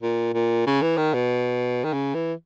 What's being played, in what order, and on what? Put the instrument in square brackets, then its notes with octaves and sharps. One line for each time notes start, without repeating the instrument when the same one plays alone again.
[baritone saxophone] A#2
A#2
C#3
E3
D#3
B2
D#3
C#3
E3